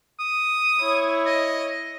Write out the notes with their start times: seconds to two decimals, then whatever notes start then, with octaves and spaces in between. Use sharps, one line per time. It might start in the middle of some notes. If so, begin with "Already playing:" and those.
0.20 D#6
0.80 E4 C#5
1.26 D#5